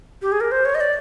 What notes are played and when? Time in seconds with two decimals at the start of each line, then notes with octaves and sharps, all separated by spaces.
0.22 G4
0.32 G#4
0.41 A#4
0.52 C5
0.65 C#5
0.75 D#5
0.80 D5